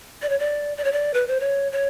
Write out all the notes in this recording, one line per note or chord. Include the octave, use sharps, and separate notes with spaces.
D5
C#5
D5
D5
C#5
D5
B4
C5
C#5
C#5